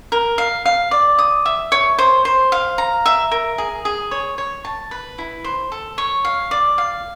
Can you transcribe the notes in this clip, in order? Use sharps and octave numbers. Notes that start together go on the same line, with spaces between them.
A#4
F5
F5
D5
D#6
E5
C#5
C5
C5
F5
A#5
E5
A#4
G#4
G#4
C#5
C#5
A5
B4
E4
C5
A4
C#5
F5
D5
F5